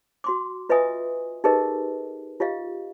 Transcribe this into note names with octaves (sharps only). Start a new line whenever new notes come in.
F#4 C6 D6
F4 B4 D#5 E5 G#5 D#6
D#4 G4 G#4 A#4 B4 D#5
F4 G4 D#5 F5